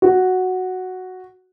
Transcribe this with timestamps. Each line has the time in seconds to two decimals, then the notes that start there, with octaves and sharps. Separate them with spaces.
0.02 F#4